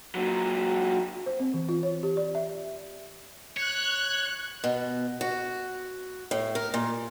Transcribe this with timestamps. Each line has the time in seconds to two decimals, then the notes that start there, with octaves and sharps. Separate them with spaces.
0.15 A#2 F#3
1.26 C5
1.40 C4
1.54 E3
1.69 F4
1.83 C#5
2.03 G4
2.17 D5
2.35 E5
3.57 C#5 F#6
4.64 B2
5.21 F#4
6.31 A2
6.55 A#4
6.74 A#2